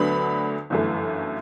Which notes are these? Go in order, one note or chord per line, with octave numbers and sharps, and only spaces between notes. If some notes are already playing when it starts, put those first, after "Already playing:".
Already playing: D2 D3 F#3 B3 B5
G1 F#2 E3 A3